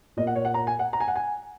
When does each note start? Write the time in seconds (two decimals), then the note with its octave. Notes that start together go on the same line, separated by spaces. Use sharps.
0.17 A#2 A#3 D#5
0.27 F#5
0.36 C#5
0.45 F#5
0.54 A#5
0.67 G#5
0.79 F#5
0.93 A#5
1.00 G#5
1.08 F#5
1.16 G#5